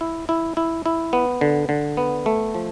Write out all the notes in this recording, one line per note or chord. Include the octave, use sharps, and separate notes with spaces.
E4
E4
E4
E4
B3
D3
D3
B3
A3
F3